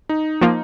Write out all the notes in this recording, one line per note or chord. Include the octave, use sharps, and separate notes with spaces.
D#4
F3 A#3 F4